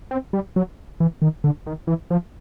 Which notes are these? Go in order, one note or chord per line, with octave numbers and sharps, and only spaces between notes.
C4
G3
F#3
E3
D#3
D3
D#3
E3
F3